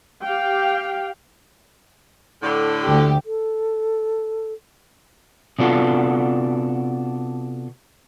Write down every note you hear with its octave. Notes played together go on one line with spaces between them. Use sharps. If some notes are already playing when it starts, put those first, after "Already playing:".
G4 F5 G5
A2 D3
D2 G4
A4
C3 B3 D4 F4 F#4 A4